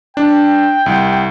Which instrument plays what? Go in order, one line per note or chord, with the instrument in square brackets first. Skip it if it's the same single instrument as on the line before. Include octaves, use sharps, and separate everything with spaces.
[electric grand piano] D4 [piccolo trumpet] G5
[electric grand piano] C2